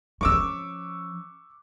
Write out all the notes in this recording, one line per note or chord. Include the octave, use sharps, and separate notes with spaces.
F3 C#4 C#6 D6 E6